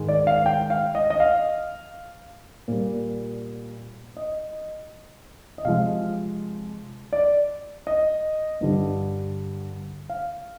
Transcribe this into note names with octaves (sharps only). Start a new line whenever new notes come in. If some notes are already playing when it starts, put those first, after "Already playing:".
Already playing: G#2 D#3 G#3
D5
F5
G5
F5
D#5
D#5
F5
A#2 G3
D#5
D#5
C3 F3 G#3 F5
D5
D#5
G2 D3 G3
F5